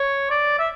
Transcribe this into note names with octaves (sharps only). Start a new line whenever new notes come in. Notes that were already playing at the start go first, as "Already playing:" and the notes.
Already playing: C#5
D5
E5